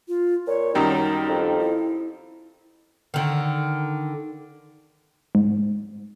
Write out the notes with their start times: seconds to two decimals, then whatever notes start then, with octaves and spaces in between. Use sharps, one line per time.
0.08 F4
0.47 A#2 C#5
0.75 F#2 D#3 G3 D#4
1.28 F2
1.60 E4
3.14 D3 D#3
5.35 G#2